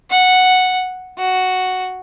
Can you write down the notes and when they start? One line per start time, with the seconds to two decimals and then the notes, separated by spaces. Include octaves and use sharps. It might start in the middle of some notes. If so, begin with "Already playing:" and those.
0.10 F#5
1.19 F#4